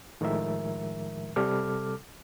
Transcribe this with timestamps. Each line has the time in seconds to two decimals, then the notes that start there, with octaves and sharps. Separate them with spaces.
0.21 A2 D#3 F3 G#3 A#4 E5
1.36 C3 G3 A4 D6 F6